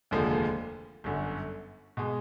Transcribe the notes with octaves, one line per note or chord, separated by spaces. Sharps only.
F1 D#2 D3 F3 G#3
G1 F#2 D3
B2 G#3